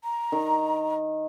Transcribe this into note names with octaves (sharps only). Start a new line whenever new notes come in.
A#5
D#3